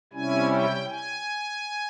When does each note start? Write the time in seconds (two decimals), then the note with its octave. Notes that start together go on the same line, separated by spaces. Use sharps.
0.13 C3 G3 C#4 E4 G#5
0.51 G5
0.89 G#5